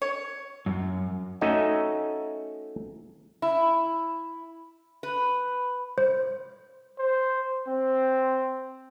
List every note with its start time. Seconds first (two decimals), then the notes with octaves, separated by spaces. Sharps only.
0.02 C#5
0.66 F#2
1.41 A3 C#4 D#4 F#4 D#5 E5
3.42 E4
5.03 B4
5.98 C5
6.98 C5
7.67 C4